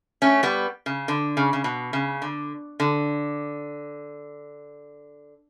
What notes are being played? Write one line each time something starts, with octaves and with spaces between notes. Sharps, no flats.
A3 C#4
G3 B3
C#3
D3
C#3
C#3
B2
C#3
D3
D3